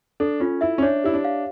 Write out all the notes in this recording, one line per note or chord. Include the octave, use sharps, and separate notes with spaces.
D4 A4
C#4 F4
E4 E5
C#4
D4 C#5
E4 G4
D4
F5